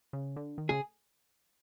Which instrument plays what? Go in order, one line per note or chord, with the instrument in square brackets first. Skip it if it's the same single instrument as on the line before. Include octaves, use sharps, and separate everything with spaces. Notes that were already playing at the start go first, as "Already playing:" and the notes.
[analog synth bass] C#3
D3
D#3
[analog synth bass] C#3 [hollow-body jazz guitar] G#4